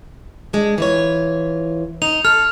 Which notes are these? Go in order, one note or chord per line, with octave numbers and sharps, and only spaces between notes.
G#3 D4
E3 F4 C#5
D#4 F7
A4 F6